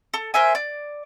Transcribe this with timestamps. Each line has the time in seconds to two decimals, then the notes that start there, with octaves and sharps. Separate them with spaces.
0.14 A4
0.34 A#4 C5 E5 G#5
0.55 D5